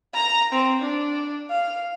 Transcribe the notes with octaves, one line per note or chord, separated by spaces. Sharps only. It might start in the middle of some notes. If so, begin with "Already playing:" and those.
A#5
C4
D4
F5